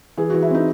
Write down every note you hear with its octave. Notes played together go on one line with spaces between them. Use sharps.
E3 G#4
F#4
E3
E4
C4 D#4